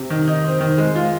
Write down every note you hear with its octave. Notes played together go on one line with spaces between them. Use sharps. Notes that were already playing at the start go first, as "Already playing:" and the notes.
Already playing: C3
D#3
D#4
C4
D#3
G#3
F4